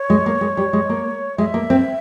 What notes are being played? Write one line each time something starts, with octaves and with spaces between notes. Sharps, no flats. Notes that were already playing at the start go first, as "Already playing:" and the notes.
Already playing: C#5
G#3
A#3
G#3
G3
G#3
A#3
G#3 E5
A#3
C4